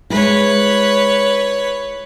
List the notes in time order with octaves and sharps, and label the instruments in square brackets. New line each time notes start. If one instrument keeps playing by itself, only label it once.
[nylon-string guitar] G#3 E4 [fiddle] B4 C#5